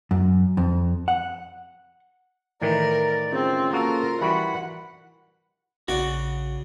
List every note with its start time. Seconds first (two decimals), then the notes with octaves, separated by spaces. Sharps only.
0.11 F#2
0.57 F2
1.08 F#5
2.62 A2 D#3 E3 A#4 D5
3.32 C#3 C4 F4
3.73 A#3 F#4 A4 A#4
4.21 E3 G3 F#4 F#5 B5
5.88 A#1 C#3 F#4 D5 F#5